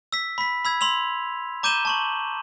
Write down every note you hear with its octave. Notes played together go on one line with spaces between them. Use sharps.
E6 B6
B5 B6
B5 E6 G#6
B5 C6 E6 F7
A#5 D6 G6 D#7 E7 G7
A5 C#6 F#7